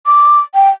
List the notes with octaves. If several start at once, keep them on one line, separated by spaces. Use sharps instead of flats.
D6
G5